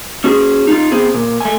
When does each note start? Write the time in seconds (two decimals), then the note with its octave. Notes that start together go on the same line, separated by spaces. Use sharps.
0.24 C#4 F#4 G#4
0.67 D#4 F4
0.92 B3 C4 G#4
1.14 A#2
1.41 A3 G#5